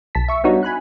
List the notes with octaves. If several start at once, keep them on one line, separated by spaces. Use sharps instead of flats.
B1 A5 B6
E5 C#6
G3 B3 D4 D#4 F#4 C#5
G#5 B5 F#6